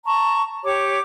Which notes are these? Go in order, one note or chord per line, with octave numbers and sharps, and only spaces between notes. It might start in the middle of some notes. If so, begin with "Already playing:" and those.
A5 A#5 C#6
G4 C#5 D6